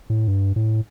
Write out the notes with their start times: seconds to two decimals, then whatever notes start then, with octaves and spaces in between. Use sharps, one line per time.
0.10 A2
0.28 G2
0.56 A2